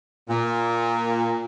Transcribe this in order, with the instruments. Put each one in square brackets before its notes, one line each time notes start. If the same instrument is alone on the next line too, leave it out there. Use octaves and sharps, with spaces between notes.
[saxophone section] A#2